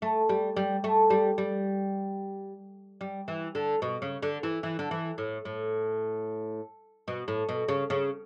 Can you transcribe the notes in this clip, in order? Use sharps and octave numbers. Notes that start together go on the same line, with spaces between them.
A3
G3
G3
A3
G3
G3
G3
E3
D3
B2
C#3
D3
E3
E3
D3
E3
A2
A2
B2
A2
B2
C#3
C#3